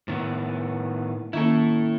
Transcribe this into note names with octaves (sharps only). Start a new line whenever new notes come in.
A2 D#3 B3
D#3 A#3 C#4 E4 A4